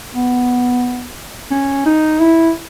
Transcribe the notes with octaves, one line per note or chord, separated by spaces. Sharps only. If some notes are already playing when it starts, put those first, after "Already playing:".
B3
C#4
D#4
E4